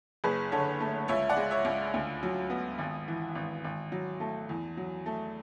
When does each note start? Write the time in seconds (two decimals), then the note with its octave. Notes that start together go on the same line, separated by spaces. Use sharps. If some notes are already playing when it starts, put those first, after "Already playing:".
0.24 F#1 G#4 B4
0.52 D3 A4 C#5
0.80 A3
1.08 C#2 C#5 E5
1.29 D5 F#5
1.36 G#3
1.51 C#5 E5
1.65 C#2
1.94 D2
2.23 F#3
2.50 B3
2.78 G#1
3.08 E3
3.35 G#1
3.64 G#1
3.92 F#3
4.20 A3
4.49 E2
4.77 F#3
5.06 A3